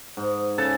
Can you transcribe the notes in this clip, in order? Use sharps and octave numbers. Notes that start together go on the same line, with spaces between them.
G#2
C#3 A4 A5